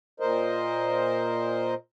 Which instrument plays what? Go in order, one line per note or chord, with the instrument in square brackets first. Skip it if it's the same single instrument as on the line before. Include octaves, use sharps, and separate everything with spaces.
[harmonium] A#2 A#4 C5 D#5